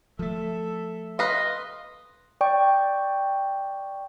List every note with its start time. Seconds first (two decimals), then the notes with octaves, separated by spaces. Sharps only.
0.19 F3 A3 A4 E5
1.19 B4 D#5 F5 C6
2.41 D5 G5 C#6